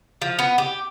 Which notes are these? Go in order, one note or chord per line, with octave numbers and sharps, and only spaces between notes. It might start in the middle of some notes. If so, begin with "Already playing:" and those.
F3
B3
G4